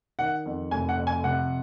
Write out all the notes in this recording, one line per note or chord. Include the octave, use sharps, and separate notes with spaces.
D#3 F#5
F2
F1 G#5
F#5
F2
G#5
C3 F#5